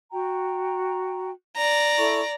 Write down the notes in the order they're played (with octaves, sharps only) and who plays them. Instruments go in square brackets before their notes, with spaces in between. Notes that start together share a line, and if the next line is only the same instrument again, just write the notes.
[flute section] F#4 G5 A#5
[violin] D5 A#5
[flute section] E4 A4 C#6